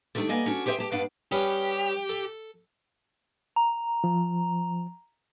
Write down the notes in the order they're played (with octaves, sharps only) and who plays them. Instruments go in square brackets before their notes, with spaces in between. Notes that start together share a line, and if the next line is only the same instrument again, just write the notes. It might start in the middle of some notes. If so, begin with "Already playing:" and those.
[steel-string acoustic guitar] D3 D#3 G3 A3 D4
A#3 B3 D5 D#5 G#5
C#4 D4 F#4
G4 G#4 C5 C#5 E5 G5
G4 A5
G2 B3 D4 F5 F#5
[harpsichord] G2 B3 C#4 [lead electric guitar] G4
[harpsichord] A4
[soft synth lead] A#5
[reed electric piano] F3